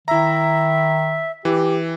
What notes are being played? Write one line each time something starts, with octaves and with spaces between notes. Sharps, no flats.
D#3 E4 E5 A#5
E3 G4